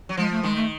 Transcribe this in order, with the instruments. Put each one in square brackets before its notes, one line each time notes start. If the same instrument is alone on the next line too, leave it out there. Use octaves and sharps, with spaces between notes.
[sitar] F#3
[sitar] F3 [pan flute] G#3
[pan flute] A3
[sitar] D#3 [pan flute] G#3
[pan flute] A3